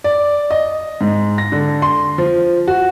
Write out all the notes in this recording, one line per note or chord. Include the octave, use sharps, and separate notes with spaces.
D5
D#5
G#2
A#6
D3
C6
F3
F#4